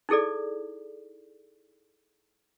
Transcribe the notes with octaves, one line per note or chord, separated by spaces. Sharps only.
D#4 E4 G#4 A4 D5